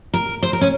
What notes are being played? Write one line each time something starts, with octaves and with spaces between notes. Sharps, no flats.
A#4
C5
A#4
C#4